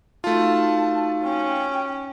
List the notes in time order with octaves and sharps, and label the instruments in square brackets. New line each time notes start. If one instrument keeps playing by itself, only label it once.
[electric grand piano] A3 F4 [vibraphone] D#4 F#4 F5 [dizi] A5
[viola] C#4 [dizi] G5